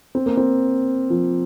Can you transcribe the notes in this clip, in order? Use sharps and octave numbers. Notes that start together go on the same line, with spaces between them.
C4
A#3
C4
F3